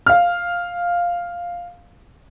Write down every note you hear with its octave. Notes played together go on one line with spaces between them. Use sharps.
F5 F6